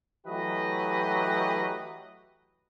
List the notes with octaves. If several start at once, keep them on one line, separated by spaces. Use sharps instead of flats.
E3 F#3 A3 G4 B4 D#5